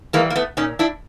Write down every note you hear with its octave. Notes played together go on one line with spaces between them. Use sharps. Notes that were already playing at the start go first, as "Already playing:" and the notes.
E3 G3 G#3 A#3
A#3
A3 B3
A#2 C#4 D#4
D4 E4